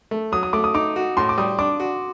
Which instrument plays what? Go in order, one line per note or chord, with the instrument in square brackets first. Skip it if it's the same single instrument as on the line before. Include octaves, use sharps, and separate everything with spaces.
[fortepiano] A3
[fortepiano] F#3 [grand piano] D#6
[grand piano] D#6
[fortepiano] A3 [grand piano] D6
[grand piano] D#6
[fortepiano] D#4 [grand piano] D6
[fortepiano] F#4
[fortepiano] A2 [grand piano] C6
[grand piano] D6
[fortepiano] G3 [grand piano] D#6
[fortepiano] D4 [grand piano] D6
[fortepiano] F#4